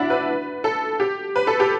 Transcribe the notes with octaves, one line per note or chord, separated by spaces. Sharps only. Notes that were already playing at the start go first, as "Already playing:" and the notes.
Already playing: D4 E4 F#4 E5
B4
A4
G4
B4
A4
G4